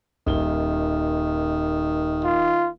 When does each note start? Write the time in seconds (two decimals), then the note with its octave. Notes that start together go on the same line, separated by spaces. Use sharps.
0.27 D#1 D#3 G7
2.24 F4